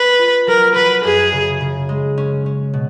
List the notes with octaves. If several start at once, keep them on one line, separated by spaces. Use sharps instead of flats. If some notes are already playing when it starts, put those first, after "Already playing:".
Already playing: B4
F4
F#3 A#4
F#3 B4
F#2 G#4
C#3
C#3
G#3
C#4
C#4
B2